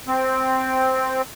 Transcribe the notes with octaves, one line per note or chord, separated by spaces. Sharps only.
C4